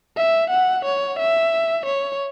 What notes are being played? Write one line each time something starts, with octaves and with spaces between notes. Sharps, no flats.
E5
F#5
C#5
E5
C#5